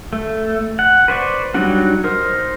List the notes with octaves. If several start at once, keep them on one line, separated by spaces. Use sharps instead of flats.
A3
F#5
B4 C5 D5 C#6
F#3 G3 D4 D#4 F#4
D#4 A#4 C5